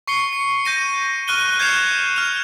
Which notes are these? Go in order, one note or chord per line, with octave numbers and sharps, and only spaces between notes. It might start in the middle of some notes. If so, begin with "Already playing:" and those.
C#6 C7 C#7 G7
C#7
G6 A#6 D#7
C#6 F6 F#6 D#7 G7
G6 G#6 C7 C#7 E7 F7
F6 F7